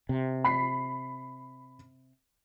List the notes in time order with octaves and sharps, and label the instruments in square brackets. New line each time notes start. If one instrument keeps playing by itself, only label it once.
[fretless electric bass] C3
[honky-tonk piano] B5 B6 C7